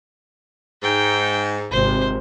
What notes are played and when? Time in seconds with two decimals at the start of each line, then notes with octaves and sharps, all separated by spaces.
0.83 G#2 G5
1.71 G#1 C3 C5